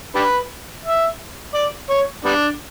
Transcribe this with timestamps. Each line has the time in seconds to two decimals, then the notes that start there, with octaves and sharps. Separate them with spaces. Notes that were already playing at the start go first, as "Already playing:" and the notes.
0.15 D4 G4 B4
0.85 E5
1.54 D5
1.90 C#5
2.25 G3 B3 D4